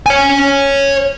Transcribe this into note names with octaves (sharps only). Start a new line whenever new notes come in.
C#5 G#5